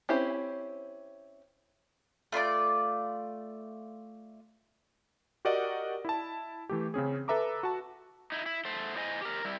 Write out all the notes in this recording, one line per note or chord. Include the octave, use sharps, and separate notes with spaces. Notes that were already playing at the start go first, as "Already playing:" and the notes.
C4 C#4 E4 G4 C5
A3 F4 D5 D6
F#4 G4 A#4 D5 D#5 F#5
E4 A5
E3 A3 G4
C#3 C4 C#4 G#4
A4 B4 E5 A#5 D6
F#4 A5
D#4 E4
E4
A3 C5
E4 C5 D#5 G#5
G4 A#4
G3 E4